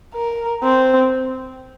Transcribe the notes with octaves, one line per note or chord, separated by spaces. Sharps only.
A#4
C4